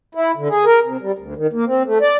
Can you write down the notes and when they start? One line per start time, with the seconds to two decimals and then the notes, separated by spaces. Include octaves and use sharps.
0.15 E4
0.37 D3
0.50 G#4
0.65 A#4
0.84 C3
1.01 G3
1.19 D2
1.36 D#3
1.53 A#3
1.66 C4
1.86 A3
2.01 D5